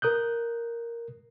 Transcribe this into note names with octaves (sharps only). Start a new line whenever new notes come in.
A#4 D#6 F#6 G6